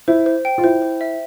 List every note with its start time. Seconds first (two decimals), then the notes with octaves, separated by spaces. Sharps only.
0.08 E4 C5
0.26 C5
0.45 G5
0.58 F4
0.64 E4 C5
0.82 C5
1.01 E5